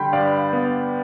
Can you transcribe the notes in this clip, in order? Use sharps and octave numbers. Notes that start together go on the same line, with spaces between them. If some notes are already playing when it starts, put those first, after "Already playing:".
Already playing: D3 G3 G5 B5 C6
G2 D5 F5
B3